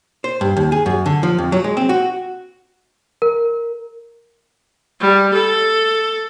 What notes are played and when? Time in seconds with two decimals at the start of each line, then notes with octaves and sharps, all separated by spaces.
0.24 C5
0.41 G2
0.57 D#2
0.72 G#4
0.86 F#2
1.06 D3
1.23 F3
1.39 F2
1.52 F#3
1.64 G#3
1.77 C4
1.89 F#4
3.22 A#4
5.00 G3
5.34 A4